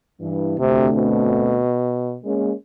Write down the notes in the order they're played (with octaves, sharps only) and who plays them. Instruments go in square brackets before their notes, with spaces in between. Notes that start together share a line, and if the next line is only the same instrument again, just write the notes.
[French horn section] G2 E3
[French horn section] D2 A3 C4 [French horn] C3
[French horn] B2
[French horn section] G#3 A#3 C#4